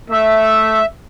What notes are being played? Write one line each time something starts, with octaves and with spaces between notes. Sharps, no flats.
A3 E5